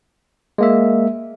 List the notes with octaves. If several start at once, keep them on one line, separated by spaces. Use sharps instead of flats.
G#3 A#3 E5